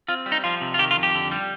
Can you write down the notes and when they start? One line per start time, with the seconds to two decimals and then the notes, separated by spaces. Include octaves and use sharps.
0.08 C4 F4
0.26 G3
0.32 D#4
0.44 F3 F4
0.61 C3
0.74 F4
0.79 D#3 G4
0.91 F4
0.96 F2
1.03 G4
1.15 D3
1.31 G3